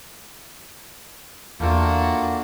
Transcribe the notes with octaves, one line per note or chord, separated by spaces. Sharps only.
E2 A3 A#3 D4 F4 F#4 G5